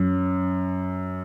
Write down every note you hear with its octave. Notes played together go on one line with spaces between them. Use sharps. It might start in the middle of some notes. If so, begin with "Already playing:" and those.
Already playing: F#2